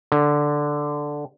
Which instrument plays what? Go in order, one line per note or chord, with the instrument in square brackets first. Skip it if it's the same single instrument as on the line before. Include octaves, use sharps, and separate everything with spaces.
[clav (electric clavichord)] D3